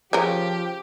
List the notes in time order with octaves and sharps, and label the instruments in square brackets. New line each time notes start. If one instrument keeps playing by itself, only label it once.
[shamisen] C#3 C#4 A#4 [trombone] F3 [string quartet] G4